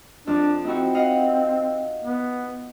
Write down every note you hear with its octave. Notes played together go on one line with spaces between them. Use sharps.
F2 D4 F6
C4 D#4 E4 F#4
D#5 F5 F#5
B3